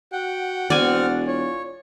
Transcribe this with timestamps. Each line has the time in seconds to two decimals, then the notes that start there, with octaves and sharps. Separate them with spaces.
0.12 F#4 F#5 G5
0.70 E1 C4 F#4 D5 F#5 G#5 F6
1.27 F4 C#5